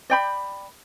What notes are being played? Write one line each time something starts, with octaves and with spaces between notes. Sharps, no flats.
D5 G5 B5